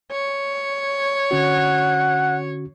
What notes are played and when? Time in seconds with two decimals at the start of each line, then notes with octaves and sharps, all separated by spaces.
0.12 C#5
1.31 D3 C#4 F#4 F#5